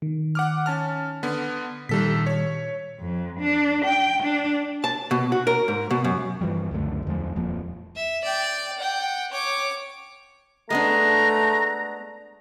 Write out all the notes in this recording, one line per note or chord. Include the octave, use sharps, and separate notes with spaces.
D#3
F#5 D6 F6
C#4 A5 F6
D3 B3
A#1 A#2 D#3 G3 A4 B6
C#5
F2
D4
G5
D4
A5
B2
F#4
A#4
G#2
B2
F#2
G2 E3 F3 G3
C#2 F#2 D3 A3
E2 F3 G#3
D#1 F2 F3 A#3
E5
D5 G5
F#5 G5
C#5 D6
G#3 A3 B3 D4 A#5